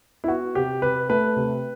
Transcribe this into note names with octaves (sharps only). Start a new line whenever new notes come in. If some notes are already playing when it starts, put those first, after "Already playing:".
E4
B3 F#4
C3 G4
C3 B4
A3 B4
C3